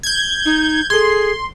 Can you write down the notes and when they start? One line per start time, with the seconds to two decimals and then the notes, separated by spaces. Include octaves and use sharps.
0.03 G6 G#6
0.46 D#4
0.90 G#4 A4 C6 G#6